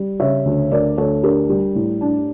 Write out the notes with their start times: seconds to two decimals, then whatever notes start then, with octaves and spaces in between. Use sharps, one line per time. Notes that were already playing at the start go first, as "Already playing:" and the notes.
Already playing: G3
0.20 C#3 C#5 E5
0.46 D2
0.71 D2 A#4 D5
0.98 D2 A4 C#5
1.23 D4 G4 A#4
1.49 G3
1.75 A2
2.01 D4